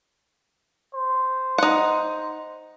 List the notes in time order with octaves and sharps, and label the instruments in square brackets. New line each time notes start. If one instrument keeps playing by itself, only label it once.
[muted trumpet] C5
[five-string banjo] D#4 F#5